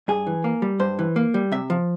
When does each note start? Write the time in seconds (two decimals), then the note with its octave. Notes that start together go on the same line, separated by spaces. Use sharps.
0.08 G2 G#4
0.27 E3
0.44 A#3
0.62 G3
0.80 G2 C5
0.99 E3
1.16 A#3
1.34 G3
1.52 C3 E5
1.70 F3